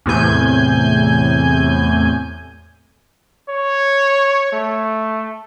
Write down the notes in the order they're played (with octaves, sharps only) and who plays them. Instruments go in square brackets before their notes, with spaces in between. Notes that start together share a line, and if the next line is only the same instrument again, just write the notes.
[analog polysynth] E2 A2 C3 G#5 G6
[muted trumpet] C#5
A3